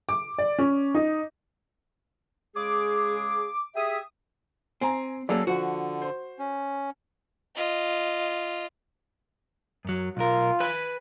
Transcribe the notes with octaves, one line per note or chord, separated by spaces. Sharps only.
D6
D5
C#4
D#4
C#3 G#3 G#4 D6
G4 G#4 E5 D#6
C4 G#5 A#5
F#3 A#3 C#4 G#4 A4 D5
D3 F3 F#4
C5
C#4
F4 D#5
F#2 F#3
B1 F4 A#4
B4 G#5 B5